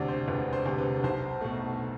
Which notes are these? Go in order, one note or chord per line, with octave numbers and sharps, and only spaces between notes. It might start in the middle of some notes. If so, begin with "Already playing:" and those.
Already playing: E1 D2 C3 D5
C5
E1 B4
C5
D2 C3
B4
B1 C5
B2 A3